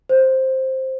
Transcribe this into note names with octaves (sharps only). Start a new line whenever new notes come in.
C5